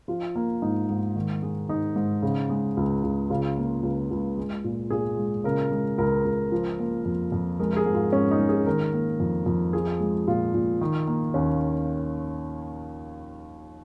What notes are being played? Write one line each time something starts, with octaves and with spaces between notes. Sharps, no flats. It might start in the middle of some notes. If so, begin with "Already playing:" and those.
F3 F4
A#3
G#2 D#4
G#2
D#3
G#3
G#2 D#4
G#2
C#3
G#3
C#2
C#2
C#3 F4
A#3
C#2
C#2
G#3
A#2
A#2 G#4
G#3
C#3 A#4
G#3
C#2 A#4
C#2
F3
A#3
F2
F2
G#3 A#4
A#4
G#4
G#2
F4
G#2 C#4
D#4
G#3
G#4
D#3 A#4
A#3
F2
F2
F3 G#4
G#3
A#2 F4
A#2
D#3
A#3
D#2 C#4